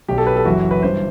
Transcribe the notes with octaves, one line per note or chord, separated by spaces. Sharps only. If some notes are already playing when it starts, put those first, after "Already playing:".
B1 B2 G4
A4
B4
A4
F#1 F#2 E3 F#4
B4
G1 G2 E3 C5